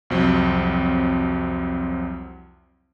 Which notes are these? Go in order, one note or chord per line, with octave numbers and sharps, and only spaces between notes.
C2 F2 F#3 C4